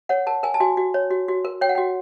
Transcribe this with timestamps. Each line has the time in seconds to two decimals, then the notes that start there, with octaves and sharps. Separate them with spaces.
0.09 C#5 F#5
0.27 A#4 A5
0.43 A#4 G#5
0.54 A5
0.60 F#4 G#5
0.77 F#4
0.94 C#5
1.11 F#4
1.28 F#4
1.45 A#4
1.61 C#5 G5
1.69 F#5
1.75 F#4 G5